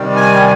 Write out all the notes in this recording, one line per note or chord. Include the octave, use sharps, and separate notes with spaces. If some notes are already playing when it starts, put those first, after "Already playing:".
Already playing: C3 D#3 G3
G#5